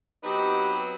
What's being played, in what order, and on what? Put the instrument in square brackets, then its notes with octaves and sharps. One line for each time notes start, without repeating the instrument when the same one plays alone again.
[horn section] F#3 B3 C4 [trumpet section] D#4 G4 [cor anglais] B4